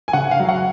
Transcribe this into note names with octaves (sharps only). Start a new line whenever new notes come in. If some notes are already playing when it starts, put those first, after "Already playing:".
G#5
C#3 F#5
F5
F#3
F#5